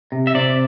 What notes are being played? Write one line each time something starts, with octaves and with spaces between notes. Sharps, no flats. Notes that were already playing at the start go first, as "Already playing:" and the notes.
C3
E5
C3 D5